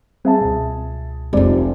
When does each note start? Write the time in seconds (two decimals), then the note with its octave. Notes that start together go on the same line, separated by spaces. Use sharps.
0.25 G3 C4 G#4 E5 A5
0.41 C#2 B2
1.33 F1 C3 G#3 F4 D5